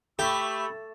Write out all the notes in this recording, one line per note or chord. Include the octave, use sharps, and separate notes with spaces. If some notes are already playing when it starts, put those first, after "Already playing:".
A3 G4 B5 C#6 E6